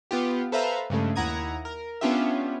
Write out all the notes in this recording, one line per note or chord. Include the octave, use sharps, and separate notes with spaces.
B3 F4 G4
A4 B4 C5 E5 F5 A#5
G2 C#3 G#3 A3
D#2 E4 F#5 A#5 D#6 G#6
A#4
B3 C#4 D4 F4 G4 E5